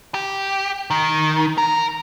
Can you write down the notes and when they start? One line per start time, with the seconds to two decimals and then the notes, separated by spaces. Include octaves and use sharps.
0.14 G4
0.90 D#3
1.58 A#4